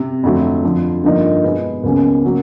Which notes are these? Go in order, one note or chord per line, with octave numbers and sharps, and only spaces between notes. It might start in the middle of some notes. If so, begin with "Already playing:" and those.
Already playing: C3
F2 D3 F#3 A3
F2 D3 F3
G2 D3 F3 A#3 D#4
B2 G#3 B3 D4
C#2 B2 F#3 A#3 C#4
C#3 F#3 A#3